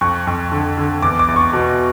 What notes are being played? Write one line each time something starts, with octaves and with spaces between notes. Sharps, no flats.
F2 C#6
F2
D3
D3
E2 D6
D6
E2
C#6
B2